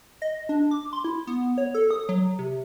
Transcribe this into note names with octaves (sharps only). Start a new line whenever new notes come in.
D#5
D4
D6
C6
E4
B3
C#5
A4
D#6
F#3
C3